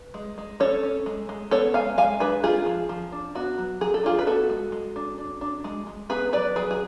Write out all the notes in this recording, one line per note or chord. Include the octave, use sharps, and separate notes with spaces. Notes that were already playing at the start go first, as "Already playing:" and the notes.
Already playing: B4
G#3
G#3
C#4 A4 C#5
C#4
G#3
G#3
B3 A4 C#5
G#3 F5 G#5
G#3 F5 G#5
D4 G#4 B4
G#3 F4 G#4
F3
F3
D4
B3 F#4
F#3
F#3 G#4
A4
D4 F4 G#4
B4
B3 F#4 A4
G#3
G#3
D4
D4
D4
G#3
G#3
B3 G#4 B4
F#3 B4 D5
F#3 G#4 B4
G#4